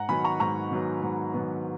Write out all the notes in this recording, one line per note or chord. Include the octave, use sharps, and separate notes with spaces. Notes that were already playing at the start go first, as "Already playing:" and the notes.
Already playing: G#2 F#5 A#5
D#3 F#3 B3 G#5 B5
A#5 C#6
G#2 A#5 C#6
D#3 F#3 B3
G#2
D#3 F#3 B3